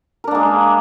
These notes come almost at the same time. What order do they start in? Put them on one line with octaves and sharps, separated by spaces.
A#4 D4 A#3 G#3